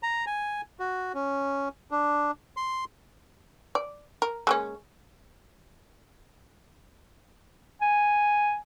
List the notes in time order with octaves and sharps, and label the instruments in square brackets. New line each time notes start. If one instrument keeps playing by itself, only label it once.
[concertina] A#5
G#5
F#4
C#4
D4
C6
[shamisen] D5
A#4
G#3 A#3 C#4
[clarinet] G#5